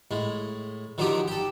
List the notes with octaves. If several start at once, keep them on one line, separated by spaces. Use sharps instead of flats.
A2 G#3
D3 D#3 F3 F#3 D#4 G4
G4 A4